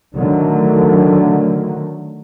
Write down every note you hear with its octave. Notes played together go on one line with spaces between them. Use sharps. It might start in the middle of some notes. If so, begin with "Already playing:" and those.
D3 D#3 F#3 A3